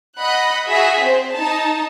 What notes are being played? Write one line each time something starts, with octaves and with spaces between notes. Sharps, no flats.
D#5 F#5 B5 F#6
F#4 G#4 E5 B6
C4 C5
D#4 A5